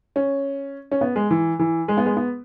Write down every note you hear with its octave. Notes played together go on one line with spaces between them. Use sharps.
C#4
C#4
B3
G#3
E3
E3
G#3
B3
G#3
B3